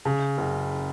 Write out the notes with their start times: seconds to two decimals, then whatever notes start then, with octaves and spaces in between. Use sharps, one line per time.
0.05 C#3
0.38 F#1